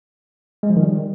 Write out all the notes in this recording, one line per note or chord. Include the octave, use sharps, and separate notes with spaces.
G#3
F3
D#3
G3